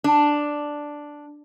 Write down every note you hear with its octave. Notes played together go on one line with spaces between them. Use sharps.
D4